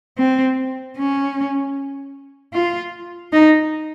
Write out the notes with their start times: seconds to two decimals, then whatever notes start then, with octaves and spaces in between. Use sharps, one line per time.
0.18 C4
0.97 C#4
2.53 F4
3.33 D#4